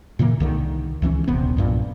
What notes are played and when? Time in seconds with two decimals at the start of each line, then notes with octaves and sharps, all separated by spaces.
0.19 A#2 C#3 E3 A#3
0.40 C2 D3 D#3
1.02 C#2 E3 A#3 C#4
1.28 D#1 A#1 C3 B3
1.57 B1 G2 A#2